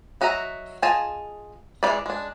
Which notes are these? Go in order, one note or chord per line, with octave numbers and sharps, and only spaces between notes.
F#3 F#4 D#5 E5 A#5
F4 G#4 D#5 G#5 A5
E3 G#3 C#4 E4 D5
G#3 D4